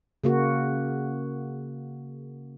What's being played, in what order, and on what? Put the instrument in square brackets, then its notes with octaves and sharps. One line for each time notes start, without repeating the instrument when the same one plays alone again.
[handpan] C#3 A#3 F#4